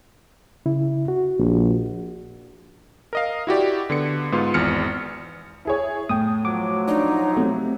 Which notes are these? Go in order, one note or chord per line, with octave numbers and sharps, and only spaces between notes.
C#3 E4
F#4
A#1
A#4 D#5 F5
E4 F#4 G4 D5
D3 B3 C#7
G#2 B3 F4
G#1 E2 F6 C#7
E4 G#4 C#5
A2 G5 D#6
F3 F#3 D6
D4 D#4 C#5 D6
C3 A3